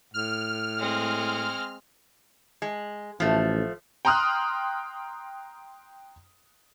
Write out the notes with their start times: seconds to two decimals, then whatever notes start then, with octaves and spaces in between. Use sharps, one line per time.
0.14 A2 F6
0.80 G#3 C4
2.62 G#3
3.20 A1 F3 A3
4.05 G5 A#5 C6 D#6 F6 F#6